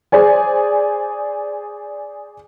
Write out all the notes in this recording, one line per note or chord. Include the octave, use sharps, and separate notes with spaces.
G#4 C5 D5 G#5